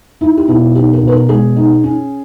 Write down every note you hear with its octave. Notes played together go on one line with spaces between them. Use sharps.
D#4 E4
G4
B2 E4
D#4 G4
A#4
B2 B4
A#4
G#3 G#4
D#4
C#4